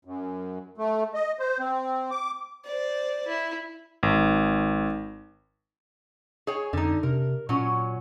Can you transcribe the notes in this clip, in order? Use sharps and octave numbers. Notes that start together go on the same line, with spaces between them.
F#2
A3
D#5
C5
C4
D6
C5 D5
E4
G#1
G#4 C#5 G#5
F2 D3 D#4
C3 A#4
A#2 F#3 C#4